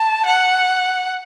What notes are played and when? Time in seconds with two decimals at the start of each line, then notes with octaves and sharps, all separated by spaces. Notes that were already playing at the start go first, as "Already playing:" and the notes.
Already playing: A5
0.26 F#5